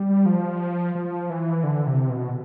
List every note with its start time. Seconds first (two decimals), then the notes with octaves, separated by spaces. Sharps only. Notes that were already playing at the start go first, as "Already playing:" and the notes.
Already playing: G3
0.26 F3
0.95 F3
1.30 E3
1.64 D3
1.87 C3
2.09 B2